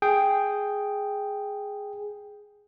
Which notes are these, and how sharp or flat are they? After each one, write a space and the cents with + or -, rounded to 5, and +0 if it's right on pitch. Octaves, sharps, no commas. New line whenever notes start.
G#4 +0 G5 +0